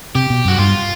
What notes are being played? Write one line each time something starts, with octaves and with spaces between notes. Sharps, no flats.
C3 G4
B2
F#2 F#4
G2 F4